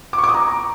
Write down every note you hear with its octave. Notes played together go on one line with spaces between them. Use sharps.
D6
C#6
D6
D#6
A#5